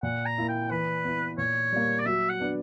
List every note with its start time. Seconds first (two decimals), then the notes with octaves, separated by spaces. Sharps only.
0.03 A#2 F#5
0.26 A#5
0.38 A#3 E4
0.49 G5
0.71 E3 B4
1.04 B3 E4
1.38 A#2 C#5
1.72 G3 A#3
1.99 D5
2.06 F#3 E5
2.29 F#5
2.40 B3 D4